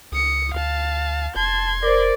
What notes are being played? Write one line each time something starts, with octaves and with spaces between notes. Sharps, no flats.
C#2 D#6 C#7
D2 F5 A5
F1 A5 C6 G#6
A#4 C5 D5